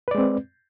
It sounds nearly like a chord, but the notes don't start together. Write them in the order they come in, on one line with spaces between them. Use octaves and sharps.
B4 D5 G#3 C4